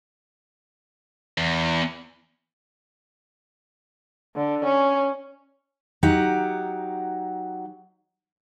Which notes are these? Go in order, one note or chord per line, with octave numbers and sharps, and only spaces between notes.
E2
D3
C#4
F#3 D#4 G4 F#5